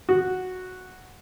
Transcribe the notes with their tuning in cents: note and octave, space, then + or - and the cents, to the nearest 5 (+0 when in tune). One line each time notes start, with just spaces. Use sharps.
F#4 -5